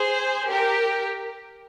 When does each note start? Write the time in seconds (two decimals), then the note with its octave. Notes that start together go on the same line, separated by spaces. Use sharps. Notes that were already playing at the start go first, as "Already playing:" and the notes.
Already playing: G#4 C5
0.49 G4 A#4